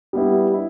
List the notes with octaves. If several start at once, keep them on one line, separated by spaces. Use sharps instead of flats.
G3 B3 E4
E4